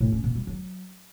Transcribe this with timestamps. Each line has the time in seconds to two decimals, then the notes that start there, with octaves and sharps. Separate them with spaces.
0.01 A2
0.12 C#4
0.24 A#2
0.35 G3
0.47 F#3